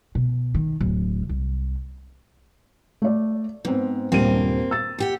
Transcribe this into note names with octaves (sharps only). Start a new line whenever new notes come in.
B2
D#3
D1
C2
A3 D5
G#2 B3 C4
D#1 G2 A#3 C4 D#7
E6 A6
A#2 G4 F#5